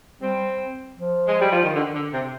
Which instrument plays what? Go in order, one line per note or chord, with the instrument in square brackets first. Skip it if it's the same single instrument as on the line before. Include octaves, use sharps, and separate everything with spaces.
[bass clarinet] G3 [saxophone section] C4
[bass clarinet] F3
[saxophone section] G#3
G3
F3
D#3
D3
D3
C3